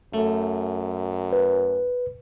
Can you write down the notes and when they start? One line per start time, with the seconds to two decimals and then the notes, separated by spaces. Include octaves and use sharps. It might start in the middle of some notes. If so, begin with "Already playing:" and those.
0.14 F#2 A3
1.33 B4